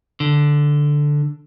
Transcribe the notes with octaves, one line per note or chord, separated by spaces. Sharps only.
D3